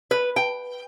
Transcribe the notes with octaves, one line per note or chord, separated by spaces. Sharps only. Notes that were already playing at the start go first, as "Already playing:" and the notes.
B4
G5